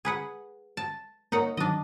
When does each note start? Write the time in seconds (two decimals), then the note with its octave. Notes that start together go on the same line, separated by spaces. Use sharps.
0.05 G#4 B4 F#5
0.77 A5
1.32 A#3 D#4 A#4 C#5 F#5
1.57 D#3 F#3 D4 D#5